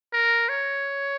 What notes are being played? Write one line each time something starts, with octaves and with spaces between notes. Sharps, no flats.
A#4
C#5